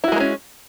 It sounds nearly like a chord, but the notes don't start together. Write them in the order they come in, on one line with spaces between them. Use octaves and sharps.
E4 F#4 G#3 A#3 C#4